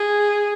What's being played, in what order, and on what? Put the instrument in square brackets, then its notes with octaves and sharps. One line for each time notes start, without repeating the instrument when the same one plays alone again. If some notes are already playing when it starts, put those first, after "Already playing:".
Already playing: [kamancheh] G#4